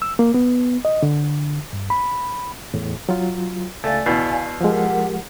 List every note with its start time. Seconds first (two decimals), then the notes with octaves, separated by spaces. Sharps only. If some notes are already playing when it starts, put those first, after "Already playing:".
0.02 E6
0.19 A#3
0.34 B3
0.85 D#5
1.03 D3
1.73 G2
1.90 B5
2.74 E2 A2
3.09 F#3 F4
3.84 C#2 A3 D5 F5 G#5 A6
4.06 E2 B2
4.61 F3 G#3 G4 A#4 F#5